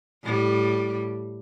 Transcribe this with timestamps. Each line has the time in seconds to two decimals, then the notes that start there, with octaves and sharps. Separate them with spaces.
0.23 A2 G3